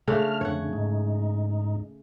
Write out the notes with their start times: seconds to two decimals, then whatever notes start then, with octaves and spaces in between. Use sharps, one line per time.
0.08 C#3 A3 D4 F6
0.41 F2 D3 C#5 F#5
0.73 G#2 D#4